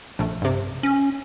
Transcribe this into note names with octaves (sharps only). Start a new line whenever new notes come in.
A#1 A3
G2 C3
C#4